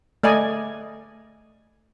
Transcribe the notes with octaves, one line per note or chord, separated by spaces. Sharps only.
A3 D5 D#5 G#5